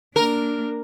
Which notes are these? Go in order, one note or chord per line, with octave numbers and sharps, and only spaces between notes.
A#3 D4 A#4